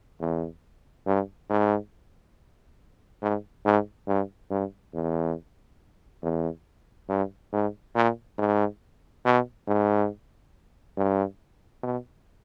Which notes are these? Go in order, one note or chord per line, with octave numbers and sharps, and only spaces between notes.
E2
G2
G#2
G#2
G#2
G2
G2
E2
E2
G2
G#2
A#2
G#2
B2
G#2
G2
B2